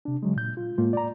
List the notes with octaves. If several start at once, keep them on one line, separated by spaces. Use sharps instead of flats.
C3 D4
C#3 F#3 G#3
A#2 G6
F4
A2 G#3 A#3 F4
D5 A#5